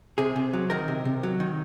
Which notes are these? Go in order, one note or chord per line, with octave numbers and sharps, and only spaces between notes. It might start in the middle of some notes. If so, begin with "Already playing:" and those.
C3 G#4
C3
F#3
D#3 A#4
C3
C3
F#3
D#3